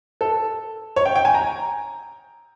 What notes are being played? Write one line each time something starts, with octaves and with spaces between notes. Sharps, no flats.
A4
C#5
G5
G5
G#5
A#5